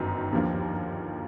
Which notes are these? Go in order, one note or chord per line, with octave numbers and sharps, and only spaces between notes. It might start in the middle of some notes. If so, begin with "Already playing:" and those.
Already playing: G1 F#2 D#3
D#2 D3 F3 A#3